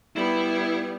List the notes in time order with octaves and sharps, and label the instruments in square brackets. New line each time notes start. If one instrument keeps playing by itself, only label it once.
[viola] G3 B3 [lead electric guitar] E4